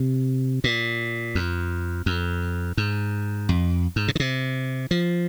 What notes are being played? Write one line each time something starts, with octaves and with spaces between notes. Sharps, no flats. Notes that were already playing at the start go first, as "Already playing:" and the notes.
Already playing: C3
A#2
F2
F2
G#2
F2
G#2
C3
D#3
C3
F3